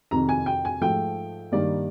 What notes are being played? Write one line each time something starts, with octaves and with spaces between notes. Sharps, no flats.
F2 C3 D#3 A#5
G#5
G5
G#5
G#2 F3 A3 G5
G2 D#3 G3 A#3 D5